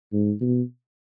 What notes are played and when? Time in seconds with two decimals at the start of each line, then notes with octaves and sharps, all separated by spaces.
0.13 G#2
0.41 B2